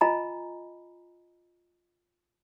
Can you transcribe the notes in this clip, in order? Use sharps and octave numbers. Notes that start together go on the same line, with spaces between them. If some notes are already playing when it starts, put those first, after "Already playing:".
F4 D#5 G#5 A#5 B5